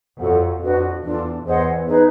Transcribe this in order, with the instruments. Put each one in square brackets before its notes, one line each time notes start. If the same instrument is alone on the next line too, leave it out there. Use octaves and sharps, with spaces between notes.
[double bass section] F2 [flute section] F#4 A4 C#5 F#5
[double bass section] F2 [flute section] D4 F#4 B4
[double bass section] E2 [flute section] D4 F4 A4
[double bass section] E2 [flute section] G#4 C5 D#5 F#5
[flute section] D#4 G#4 B4